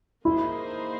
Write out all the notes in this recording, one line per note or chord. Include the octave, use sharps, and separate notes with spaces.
A#3 D#4 E4 G#4 C5